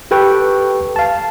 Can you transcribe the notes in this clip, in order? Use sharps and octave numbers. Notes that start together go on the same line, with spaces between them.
G4 A4 B4 G5 C#6
F5 A5